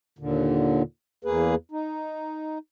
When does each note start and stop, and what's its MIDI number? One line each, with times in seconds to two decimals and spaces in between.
0.19 0.83 39
0.19 0.83 46
0.19 0.83 50
1.24 1.55 40
1.24 1.55 58
1.24 1.55 68
1.24 1.55 71
1.72 2.58 63